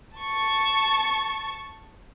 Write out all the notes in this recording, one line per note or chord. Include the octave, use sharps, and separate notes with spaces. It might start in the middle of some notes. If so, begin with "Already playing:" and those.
A5 C#6